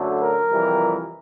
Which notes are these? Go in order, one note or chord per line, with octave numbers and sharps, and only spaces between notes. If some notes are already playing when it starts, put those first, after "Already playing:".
Already playing: F#2 D3 F#3 A3
A#4
F2 C3 E3 G3